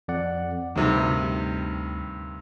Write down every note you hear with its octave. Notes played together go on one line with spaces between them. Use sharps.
F2 D5 F#5
D2 G2 C3 D#3